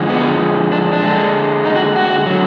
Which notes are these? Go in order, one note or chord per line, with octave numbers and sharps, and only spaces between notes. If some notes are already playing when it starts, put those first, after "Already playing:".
Already playing: D3 F3 G#3
B3
D4
D4
D3 G#3
D#4
F#4
F#4
D3 F#3